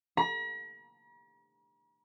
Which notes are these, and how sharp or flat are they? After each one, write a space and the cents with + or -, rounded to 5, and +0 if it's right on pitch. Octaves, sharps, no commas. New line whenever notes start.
A#5 +45